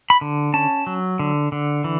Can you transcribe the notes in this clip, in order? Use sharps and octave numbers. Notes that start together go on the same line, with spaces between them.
B5
D3
C#4 A5
F#3
D3
D3
E3